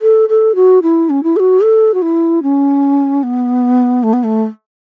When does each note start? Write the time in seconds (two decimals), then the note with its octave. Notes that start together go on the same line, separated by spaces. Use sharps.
0.02 A4
0.29 A4
0.55 F#4
0.82 E4
1.10 C#4
1.23 E4
1.36 A4
1.40 F#4
1.63 A4
1.94 F#4
2.02 E4
2.43 C#4
3.23 B3
4.03 A3
4.13 B3
4.24 A3